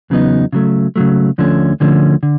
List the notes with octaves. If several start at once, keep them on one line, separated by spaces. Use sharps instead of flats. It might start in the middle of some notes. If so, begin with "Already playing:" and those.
E2 C#3 F#3 B3 D#4
C#3 F#3 A3
C#3 F#3 A3
D2 D3 F3 A3 C#4
D2 D3 F3 A3 C#4
D3